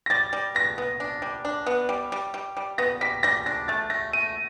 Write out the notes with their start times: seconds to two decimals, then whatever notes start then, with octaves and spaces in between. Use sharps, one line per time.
0.06 A#6
0.10 G3 A6
0.33 G3
0.55 B3 A#6
0.78 B3
1.00 D4
1.22 G3
1.45 D4
1.66 B3
1.89 G3
2.12 G3
2.34 G3
2.57 G3
2.78 B3 A#6
3.01 G3 B6
3.23 G3 A#6
3.46 D4 A#6
3.68 A3 A6
3.90 A3 A#6
4.13 A3 D#7